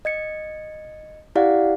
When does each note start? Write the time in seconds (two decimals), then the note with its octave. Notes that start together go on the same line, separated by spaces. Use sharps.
0.05 D#5 G#6 C#7
1.35 E4 G4 D5 F5 F#5